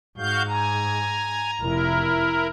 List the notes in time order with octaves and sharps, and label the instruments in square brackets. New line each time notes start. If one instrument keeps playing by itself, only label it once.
[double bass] G#2 [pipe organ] F#4 F5 G6
[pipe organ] G#5 [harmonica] A#5
[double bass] F1 [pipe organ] E4 A#4